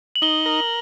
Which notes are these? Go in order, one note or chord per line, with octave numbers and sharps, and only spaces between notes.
F#7
D#4 G7
A#4